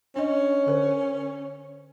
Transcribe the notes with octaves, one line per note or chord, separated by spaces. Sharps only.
C#4 D4 D#5
D3 A#4 C5